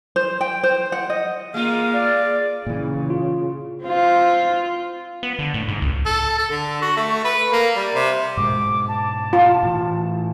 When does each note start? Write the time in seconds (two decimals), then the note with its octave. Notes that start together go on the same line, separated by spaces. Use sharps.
0.16 C5
0.41 G5
0.63 C5
0.92 F#5
1.10 D#5
1.54 G#3 A#3 F4 F5
1.93 D5
2.67 A#2 C#3 E3
3.10 F4
3.84 C4 F4
5.23 B3
5.39 D3
5.54 A2
5.68 G#2
5.82 C#2
6.05 A4
6.39 A4
6.51 D3
6.82 F#4
6.97 A3
7.24 B4
7.52 A#3
7.76 G3
7.94 C3
8.37 G#2 B2 G#3 D6
8.88 A5
9.33 F4
9.63 A2 E3